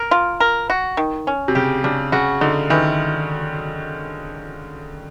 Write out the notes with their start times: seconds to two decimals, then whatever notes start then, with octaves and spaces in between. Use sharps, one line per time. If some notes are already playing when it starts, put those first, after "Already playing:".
Already playing: A#4
0.11 F4
0.40 A#4
0.70 F#4
0.97 D#3
1.27 C#4
1.48 C3
1.55 C#3 G4
1.84 C#3 D4
2.12 C#3 F#4
2.41 D3 D#4
2.70 D#3 E3